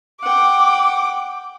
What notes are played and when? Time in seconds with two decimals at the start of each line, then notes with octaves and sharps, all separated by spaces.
0.23 F#5 G5 D6